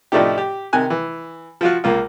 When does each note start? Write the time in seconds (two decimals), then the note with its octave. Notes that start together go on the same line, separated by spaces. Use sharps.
0.12 A2 F3 A3 D4 D#4 G4
0.38 G4
0.73 C3 D#3 G#5 F#6
0.90 E3
1.61 F3 F4 F#4
1.84 C#2 A#3 F4